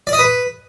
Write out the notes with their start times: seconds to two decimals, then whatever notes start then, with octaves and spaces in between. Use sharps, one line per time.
0.07 D5
0.13 D#5
0.19 B4